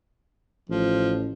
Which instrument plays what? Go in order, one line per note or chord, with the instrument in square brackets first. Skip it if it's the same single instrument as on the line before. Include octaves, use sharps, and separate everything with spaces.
[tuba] A1 [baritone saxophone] F3